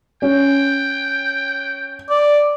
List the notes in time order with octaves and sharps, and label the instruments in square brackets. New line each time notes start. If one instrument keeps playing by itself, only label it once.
[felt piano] C#4 [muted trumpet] G5
[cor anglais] D5